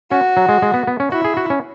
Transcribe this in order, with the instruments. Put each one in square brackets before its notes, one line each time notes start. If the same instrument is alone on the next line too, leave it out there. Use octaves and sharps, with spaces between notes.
[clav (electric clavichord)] C#4 [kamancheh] F#4
[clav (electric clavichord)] F#3
G#3
G#3
B3
B3
C#4
[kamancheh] E4 [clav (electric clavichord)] F#4
[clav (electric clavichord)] G#4
F#4
C#4